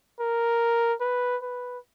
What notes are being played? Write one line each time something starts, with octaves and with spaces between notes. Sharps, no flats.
A#4
B4
B4